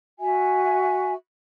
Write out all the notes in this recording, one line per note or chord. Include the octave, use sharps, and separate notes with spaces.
F#4 E5 G#5